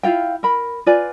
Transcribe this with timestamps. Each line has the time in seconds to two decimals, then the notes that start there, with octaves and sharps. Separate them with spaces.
0.03 E4 F4 F5 G5
0.43 A#4 B5
0.86 F4 B4 D5 G#5